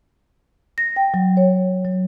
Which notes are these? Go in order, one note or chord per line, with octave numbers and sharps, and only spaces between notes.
A#6
G5
F#3
C#5
F#3